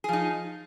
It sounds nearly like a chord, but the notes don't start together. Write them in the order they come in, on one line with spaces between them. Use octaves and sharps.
G#4 F3 D#4